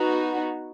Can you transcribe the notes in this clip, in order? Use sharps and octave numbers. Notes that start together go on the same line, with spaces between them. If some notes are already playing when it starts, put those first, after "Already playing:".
Already playing: B3 D#4 F#4